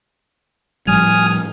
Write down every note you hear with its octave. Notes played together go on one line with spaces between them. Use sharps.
A2 F3 G3 G#5 D#6 F6